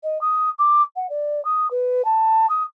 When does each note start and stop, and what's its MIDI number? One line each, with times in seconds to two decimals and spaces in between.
0.03 0.21 75
0.21 0.50 87
0.58 0.82 86
0.96 1.07 78
1.10 1.43 74
1.45 1.70 87
1.70 2.05 71
2.05 2.46 81
2.49 2.63 87